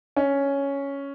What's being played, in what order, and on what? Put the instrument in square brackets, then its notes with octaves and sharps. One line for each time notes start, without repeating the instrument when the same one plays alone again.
[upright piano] C#4